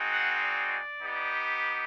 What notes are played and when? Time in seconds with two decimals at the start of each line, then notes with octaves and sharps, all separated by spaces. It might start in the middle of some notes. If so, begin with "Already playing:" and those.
Already playing: G#3 C4 D#4 F#4
0.10 F#5
0.40 D5
1.02 B3 D#4 G4